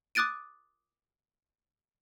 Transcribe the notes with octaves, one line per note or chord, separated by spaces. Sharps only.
D6 D#6 F#6 A6 D7 D#7